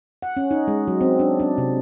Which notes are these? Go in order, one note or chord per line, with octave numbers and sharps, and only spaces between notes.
F#5
C#4
D#4
G#3
F#3
C4
D4
D4
C3